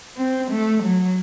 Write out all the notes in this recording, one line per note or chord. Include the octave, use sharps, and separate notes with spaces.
C4
A3
F#3